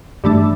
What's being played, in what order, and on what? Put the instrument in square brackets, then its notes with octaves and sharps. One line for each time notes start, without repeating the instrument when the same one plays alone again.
[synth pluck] G2 E3 A3 D4